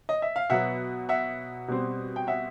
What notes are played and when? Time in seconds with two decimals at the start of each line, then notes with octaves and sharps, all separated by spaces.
0.09 D#5
0.22 E5
0.36 F5
0.50 B2 F#3 B3 E5 F#5
1.09 E5 F#5
1.68 B2 G3 C4
2.16 G5
2.27 E5 F#5